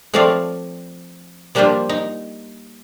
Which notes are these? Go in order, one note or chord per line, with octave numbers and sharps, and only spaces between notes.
F3 A3 C4 C#5 D5 F5
F3 G3 A#3 D4 F4 C5
D#4